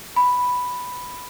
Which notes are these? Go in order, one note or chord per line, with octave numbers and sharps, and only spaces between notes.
B5